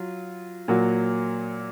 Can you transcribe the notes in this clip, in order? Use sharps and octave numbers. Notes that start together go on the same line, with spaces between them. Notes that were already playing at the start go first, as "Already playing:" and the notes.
Already playing: F#3 F4
A#2 F#3 A#3